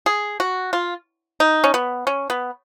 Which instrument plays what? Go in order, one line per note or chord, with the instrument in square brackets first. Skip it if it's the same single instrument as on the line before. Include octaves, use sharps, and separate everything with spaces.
[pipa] G#4
F#4
F4
D#4
C#4
B3
C#4
B3